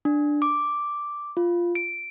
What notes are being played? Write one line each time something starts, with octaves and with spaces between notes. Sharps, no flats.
D4
D6
F4
D7